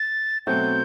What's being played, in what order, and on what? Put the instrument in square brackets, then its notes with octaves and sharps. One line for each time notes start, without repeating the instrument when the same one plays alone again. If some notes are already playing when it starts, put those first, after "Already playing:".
Already playing: [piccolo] A6
[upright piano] B2 F#3 A3 C4 F#4 [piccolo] G6